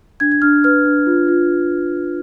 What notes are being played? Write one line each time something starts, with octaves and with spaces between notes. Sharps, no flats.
D4 G#6
G#6
D4 F6
B4 F6
D4
F4
F4